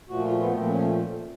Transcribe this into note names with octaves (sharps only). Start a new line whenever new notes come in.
A#2 F3 A3 F#4
F4
B3
A#2 F3 A3 C4
C#4